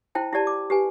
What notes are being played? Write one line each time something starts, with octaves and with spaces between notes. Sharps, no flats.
E4 C5 G5 A5
E4 G4 D5 A5
D6
G4 B4 G#5